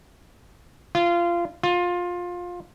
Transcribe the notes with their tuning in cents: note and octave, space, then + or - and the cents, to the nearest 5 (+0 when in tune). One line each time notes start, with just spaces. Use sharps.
F4 -20
F4 +20